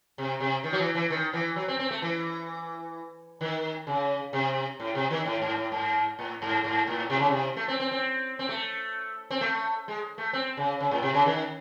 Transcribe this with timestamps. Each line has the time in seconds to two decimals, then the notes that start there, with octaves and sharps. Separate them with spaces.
0.18 C3
0.40 C3
0.64 D#3
0.73 F#3
0.79 E3
0.95 E3
1.10 D#3
1.33 E3
1.56 F#3
1.68 C4
1.79 C4
1.91 A3
2.02 E3
3.41 D#3
3.87 C#3
4.33 C3
4.80 A2
4.95 C3
5.11 D#3
5.26 A2
5.42 G#2
5.56 A2
5.72 G#2
6.19 A2
6.42 G#2
6.64 G#2
6.87 A2
7.10 C3
7.19 C#3
7.29 C3
7.57 A3
7.68 C4
7.80 C4
7.91 C4
8.39 C4
8.49 A3
9.31 C4
9.41 A3
9.88 G#3
10.18 A3
10.33 C4
10.57 C#3
10.80 C#3
10.91 A2
11.03 C3
11.14 C#3
11.26 D#3